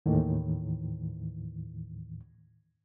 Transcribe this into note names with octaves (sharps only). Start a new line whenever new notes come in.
D#2 A2 D#3 E3